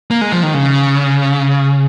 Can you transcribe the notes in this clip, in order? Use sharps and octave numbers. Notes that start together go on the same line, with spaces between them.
A#3
G#3
F3
D#3
C#3